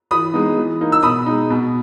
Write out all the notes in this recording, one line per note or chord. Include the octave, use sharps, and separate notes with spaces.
E3 B5 D#6
G#3 B3 D#4
E3
A#3 D#4
E6
B2 B5 D#6
G#3 D#4
B2